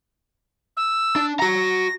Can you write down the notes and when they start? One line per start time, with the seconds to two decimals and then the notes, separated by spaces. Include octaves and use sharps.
0.77 E6
1.16 D4
1.40 F#4 A#5 A#6